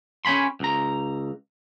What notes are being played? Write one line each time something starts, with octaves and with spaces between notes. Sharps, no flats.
C#4 C#5 G#5 B5 C6
C#2 A#5